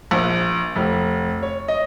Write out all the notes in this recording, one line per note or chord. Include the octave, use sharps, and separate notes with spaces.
A#1
F1
C#5
D#5